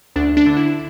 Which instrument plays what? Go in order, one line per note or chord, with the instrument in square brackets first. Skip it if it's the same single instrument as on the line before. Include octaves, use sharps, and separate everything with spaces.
[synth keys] D2 D4
D4
D3
E4